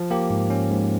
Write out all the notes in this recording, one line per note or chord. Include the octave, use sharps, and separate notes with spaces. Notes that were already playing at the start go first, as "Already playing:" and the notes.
Already playing: F3
A#3 G4
G#2
C#4
G#2